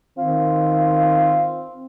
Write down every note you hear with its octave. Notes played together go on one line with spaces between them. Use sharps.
D#3 C4 F4